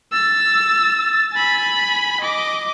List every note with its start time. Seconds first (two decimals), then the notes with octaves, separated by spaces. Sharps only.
0.12 E6 A6
1.34 G#5 B5
2.21 D#5 D6